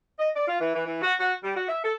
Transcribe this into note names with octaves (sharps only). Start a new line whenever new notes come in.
D#5
D5
F4
E3
E3
E3
F#4
F#4
G3
F#4
E5
A4